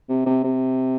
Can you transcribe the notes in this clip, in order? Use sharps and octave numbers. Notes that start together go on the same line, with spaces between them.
C3
C3
C3